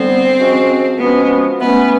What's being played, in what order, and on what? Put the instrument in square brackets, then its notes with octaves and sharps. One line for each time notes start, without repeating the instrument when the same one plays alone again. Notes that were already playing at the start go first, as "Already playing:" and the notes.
Already playing: [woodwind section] D3 G3 B3 [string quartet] C4
[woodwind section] F3 G#3 C#4 F#4
[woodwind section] F3 G#3 C#4 F#4 [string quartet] B3
[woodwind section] E3 A3 C#4 [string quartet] B3